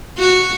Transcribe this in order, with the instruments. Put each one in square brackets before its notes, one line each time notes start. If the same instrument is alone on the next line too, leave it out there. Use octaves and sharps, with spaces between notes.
[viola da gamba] F#4